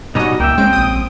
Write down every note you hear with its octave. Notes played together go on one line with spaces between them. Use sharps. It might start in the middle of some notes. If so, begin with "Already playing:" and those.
B2 G3 C#4 D#4 F#4 D#5
C#2 A#3 E5 G5
G#3 C4 C#4 D7
A#1 D#6